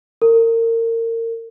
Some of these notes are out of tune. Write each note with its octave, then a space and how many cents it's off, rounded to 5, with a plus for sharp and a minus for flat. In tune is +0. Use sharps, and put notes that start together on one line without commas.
A#4 -30